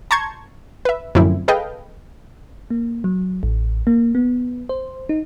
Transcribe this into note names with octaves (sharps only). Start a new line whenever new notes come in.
A5 A#5 C6 C#6 G6 G#6
B4 E5
F#2 A2 D3 F3 C4 E4
G#4 A4 B4 D#5 F5 G5
A#3
F#3
A1
A#3
B3
C5
D#4